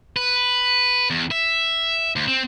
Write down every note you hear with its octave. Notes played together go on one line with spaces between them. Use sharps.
B4
E2
E5
D2
C4